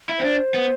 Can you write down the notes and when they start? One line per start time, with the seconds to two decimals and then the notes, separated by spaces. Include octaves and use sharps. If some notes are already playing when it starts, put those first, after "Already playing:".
0.09 E4
0.19 C4 C5
0.24 D4
0.54 B3